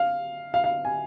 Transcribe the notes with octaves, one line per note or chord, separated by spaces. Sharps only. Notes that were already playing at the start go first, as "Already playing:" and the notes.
Already playing: F5
F5
F5
G#5